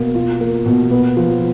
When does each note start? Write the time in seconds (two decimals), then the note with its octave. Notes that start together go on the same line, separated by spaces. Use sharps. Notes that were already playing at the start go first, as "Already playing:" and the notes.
Already playing: B2 A#3
0.15 F4
0.41 A#3
0.66 B2
0.91 B3
1.17 F3